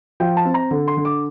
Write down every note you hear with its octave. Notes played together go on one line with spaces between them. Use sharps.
F3 G5
A5
C4
A#5
D3
C6
D3
D6